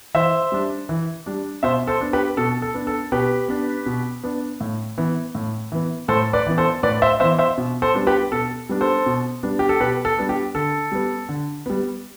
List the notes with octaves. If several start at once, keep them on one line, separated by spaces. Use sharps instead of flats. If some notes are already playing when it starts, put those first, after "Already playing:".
E3 C5 E5
G3 D4
E3
G3 D4
B2 C5 E5
A4 C5
B3 D4
G4 B4
B2 A4
A4
B3 D4
A4
B2 G4 B4
B3 D4
B2
B3 D4
A2
E3 B3
A2
E3 B3
A2 A4 C5
B4 D5
E3 B3
A4 C5
A2 B4 D5
C5 E5
E3 B3 C5 E5
C5 E5
B2
A4 C5
G3 B3 D4
G4 B4
B2 A4
G3 B3 D4
A4 C5
B2
G3 B3 D4
G4
A4
B2 G4 B4
A4
G3 B3 D4
G4
D3 A4
G3 B3
D3
G3 B3